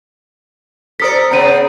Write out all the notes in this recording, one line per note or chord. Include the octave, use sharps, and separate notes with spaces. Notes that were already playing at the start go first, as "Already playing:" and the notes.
A4 A#4 C5 D5 D#6 B6
C#3 B3 C4 A#5 D#7